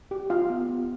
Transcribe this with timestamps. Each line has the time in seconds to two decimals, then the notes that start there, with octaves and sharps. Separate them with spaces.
0.11 G4
0.30 F4 G4 F5
0.50 B3
0.69 B3